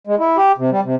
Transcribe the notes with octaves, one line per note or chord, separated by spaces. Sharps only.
G#3
E4
G4
C3
G3
C3